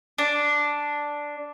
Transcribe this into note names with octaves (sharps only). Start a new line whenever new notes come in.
D4